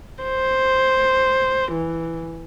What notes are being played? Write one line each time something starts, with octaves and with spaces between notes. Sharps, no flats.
C5
E3